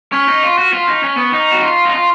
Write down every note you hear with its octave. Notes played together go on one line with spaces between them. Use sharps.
C#4 C#6 F6 B6
D#4
F4
F#4
F4
D#4
C#4
B3
D#4
F#4
F4
D#4
F4